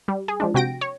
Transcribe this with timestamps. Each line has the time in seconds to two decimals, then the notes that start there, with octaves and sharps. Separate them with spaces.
0.08 G3
0.28 G#4
0.40 F3 G#3 D4
0.54 C3 F#4 G5 A#6 D7
0.81 C#5